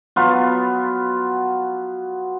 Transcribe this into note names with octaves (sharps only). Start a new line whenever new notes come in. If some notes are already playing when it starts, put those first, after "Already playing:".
F#3 B3 F4